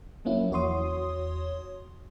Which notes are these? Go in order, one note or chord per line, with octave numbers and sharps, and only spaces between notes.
F3 F#3 A#3 C#4 E4
E2 F#4 C#5 C6 D#6